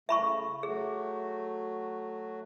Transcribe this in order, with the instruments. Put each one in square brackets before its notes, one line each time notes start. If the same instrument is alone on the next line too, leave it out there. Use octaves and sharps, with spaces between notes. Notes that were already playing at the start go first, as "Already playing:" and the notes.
[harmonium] C#3 A3 [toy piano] E5 B5 C#6
[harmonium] F#3 A3 F#4 [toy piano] G#4